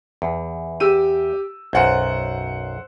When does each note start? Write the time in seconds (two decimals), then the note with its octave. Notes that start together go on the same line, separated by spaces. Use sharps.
0.22 E2
0.80 G4 E6 D#7
1.73 B1 F#2 C5 F#5